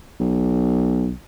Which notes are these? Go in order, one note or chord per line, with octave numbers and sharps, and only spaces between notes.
B1